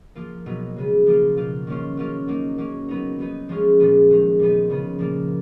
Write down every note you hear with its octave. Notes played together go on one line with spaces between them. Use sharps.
F3 A#3 F4
B2 F#3 B3 D#4
C#3 G#3 B3
F3 A#3 F4
B2 A#3 F4
D#3 A#3 C#4 F4
F#3 A#3 C#4 F4
F#3 A#3 D#4
F#3 A#3 C#4
F#3 B3 D#4
F#3 B3 D#4
F3 G#3 C#4 F4
A#2 F3 G#3 B3
D#3 G#3 D#4
A#2 F3 B3 D#4
C#3 F3 B3 D#4
A#2 F3 A#3 F4